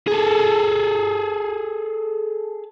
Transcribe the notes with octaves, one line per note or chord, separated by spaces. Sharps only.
G#4 A4